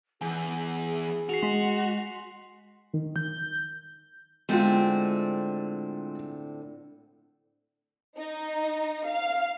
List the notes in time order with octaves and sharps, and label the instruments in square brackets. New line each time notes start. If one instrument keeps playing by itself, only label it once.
[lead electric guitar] E2 [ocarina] G#4 [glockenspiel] G#5
[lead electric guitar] F#4 [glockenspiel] C7 F7
[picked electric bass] G#3 [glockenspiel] C6 B6
[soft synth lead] D#3
G6
[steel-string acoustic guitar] A2 D3 C4 [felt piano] G#3 F4
[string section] D#4
F5